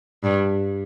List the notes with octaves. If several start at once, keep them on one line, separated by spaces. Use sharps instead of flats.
G2